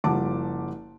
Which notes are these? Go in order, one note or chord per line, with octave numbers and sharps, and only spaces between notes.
F#1 F3 G3 F#5 A5 D6